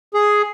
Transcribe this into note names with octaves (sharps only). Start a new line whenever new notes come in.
G#4